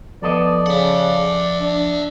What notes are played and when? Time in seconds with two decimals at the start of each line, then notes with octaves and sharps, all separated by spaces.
0.22 F3 B3 A4 D5 D#5
0.66 C#3 E5 F#5
1.60 D4